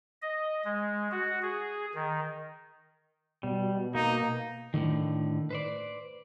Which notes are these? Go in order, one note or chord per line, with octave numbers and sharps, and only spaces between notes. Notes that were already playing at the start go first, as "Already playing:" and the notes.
D#5
G#3
F#4
G#4
D#3
B2 G3
A#3 D#4
A2 D3 D#3
B4 C5 D5